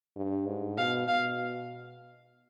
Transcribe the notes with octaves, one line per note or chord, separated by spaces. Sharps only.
G2
G#2
B2 F5
B2 F5